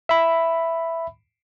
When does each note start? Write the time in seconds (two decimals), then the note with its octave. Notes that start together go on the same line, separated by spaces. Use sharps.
0.09 E5 B5